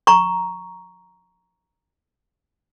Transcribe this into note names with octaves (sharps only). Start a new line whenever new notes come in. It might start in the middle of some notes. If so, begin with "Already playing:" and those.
A#5 C#6